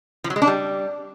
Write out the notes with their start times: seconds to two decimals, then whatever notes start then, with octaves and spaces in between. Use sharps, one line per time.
0.24 F3
0.30 F#3
0.36 G#3
0.42 D4
0.47 G3